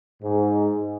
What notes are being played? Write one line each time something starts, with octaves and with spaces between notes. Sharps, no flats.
G#2